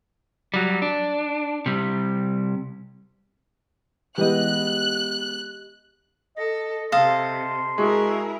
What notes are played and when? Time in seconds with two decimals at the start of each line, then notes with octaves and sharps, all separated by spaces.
0.54 F#3 G3
0.82 D4
1.66 C3 G3
4.18 E3 G#3 B3 G4 D#5 F#6
6.37 A4 D#5
6.92 C3 A4 D#5 F5 C6
7.78 G#3 E4 F#4 G#4 A#4